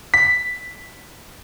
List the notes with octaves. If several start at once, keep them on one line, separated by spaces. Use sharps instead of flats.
B6